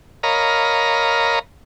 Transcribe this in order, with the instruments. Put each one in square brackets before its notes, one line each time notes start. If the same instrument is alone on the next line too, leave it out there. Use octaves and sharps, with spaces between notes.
[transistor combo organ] A#4 C#5 D#5 F5 A#5 B5